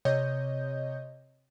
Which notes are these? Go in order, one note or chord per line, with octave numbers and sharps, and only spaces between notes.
C3 C#5 D#5 G6